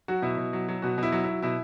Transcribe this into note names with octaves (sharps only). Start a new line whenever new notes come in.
F#3 F#4
B2 E4
B2
F#3
F#3
B2 F#4
B2 E4
F#3
E4
F#3
B2 E4